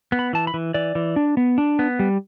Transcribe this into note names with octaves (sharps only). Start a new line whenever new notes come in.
B3
B5
E3 A5
B5
E3
E3 D5
E3
D4
B3
D4
B3
G3